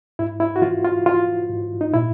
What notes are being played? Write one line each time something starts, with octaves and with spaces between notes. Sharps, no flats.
G#2 E4
E4
F#4
E3 F4
F4
E3 F4
G#2
D#4
A#2 E4